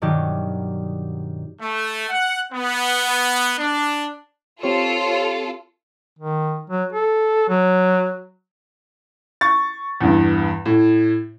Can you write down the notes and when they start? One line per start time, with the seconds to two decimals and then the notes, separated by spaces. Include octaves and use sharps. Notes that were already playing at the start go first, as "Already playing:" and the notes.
0.02 G2 B2 D#3 F#3 D#4 G4
1.60 A3
2.10 F#5
2.53 B3
3.59 D4
4.63 C4 F4 G4 A4 C#5
6.19 D#3
6.70 F#3
6.92 A4
7.49 F#3
9.41 C#6 A6
10.01 E2 G2
10.66 A2